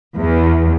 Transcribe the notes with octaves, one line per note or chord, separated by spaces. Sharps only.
E2